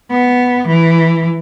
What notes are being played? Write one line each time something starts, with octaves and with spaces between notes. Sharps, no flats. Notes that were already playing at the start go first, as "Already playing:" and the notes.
B3
E3